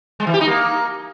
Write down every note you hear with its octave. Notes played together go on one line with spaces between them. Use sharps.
G#3
E3
G4
D#4
A#3